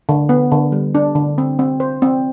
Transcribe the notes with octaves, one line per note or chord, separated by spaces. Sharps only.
D3
B3
D3
G3
D4
D3
C4
C4
C5
C4